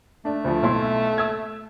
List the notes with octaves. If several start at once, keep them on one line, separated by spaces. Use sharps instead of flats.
A3 D4
D2 F3
B1 E4 C6
E6 G#6